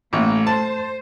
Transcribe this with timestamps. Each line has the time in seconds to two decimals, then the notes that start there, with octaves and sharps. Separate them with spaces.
0.13 A1 A3 A#3
0.47 C5 A5